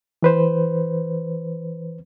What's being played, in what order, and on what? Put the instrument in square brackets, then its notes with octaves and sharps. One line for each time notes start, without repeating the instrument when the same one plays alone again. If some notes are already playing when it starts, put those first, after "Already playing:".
[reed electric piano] E3 B4 C5